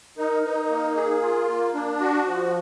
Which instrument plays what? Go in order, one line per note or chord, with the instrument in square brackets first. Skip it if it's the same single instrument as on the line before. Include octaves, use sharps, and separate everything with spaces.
[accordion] D#4 [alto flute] A#4
[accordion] D#4 [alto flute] B4
[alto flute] A#4
[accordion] A#3
G#4
F4
A#3
D4
F#4
F3